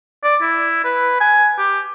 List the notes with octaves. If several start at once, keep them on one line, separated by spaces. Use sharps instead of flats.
D5
E4
B4
G#5
G4